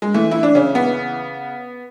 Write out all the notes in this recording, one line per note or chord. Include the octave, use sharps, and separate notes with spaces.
G#3
E3 A3
E4
D4
C#3 C#4
B3